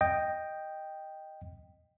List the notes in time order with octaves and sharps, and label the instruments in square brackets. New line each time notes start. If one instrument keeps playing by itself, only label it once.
[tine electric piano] D#5 G5